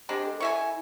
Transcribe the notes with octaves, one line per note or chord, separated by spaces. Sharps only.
G#3 C4 D4 G4
A4
E4 C#5 E5 G#5